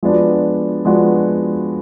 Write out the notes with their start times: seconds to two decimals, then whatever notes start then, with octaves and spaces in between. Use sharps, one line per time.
0.03 F3 G#3 B3 D4 F#4
0.85 F3 G#3 B3 D4 F#4